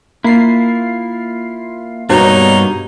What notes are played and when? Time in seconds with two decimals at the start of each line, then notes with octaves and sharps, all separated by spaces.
0.24 A#3 E4 F4 C7
2.10 G2 B2 A#3 B3 D#4 G4 C#5 A#5